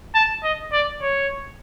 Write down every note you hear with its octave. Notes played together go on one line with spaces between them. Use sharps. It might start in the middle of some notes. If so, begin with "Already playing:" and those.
A5
D#5
D5
C#5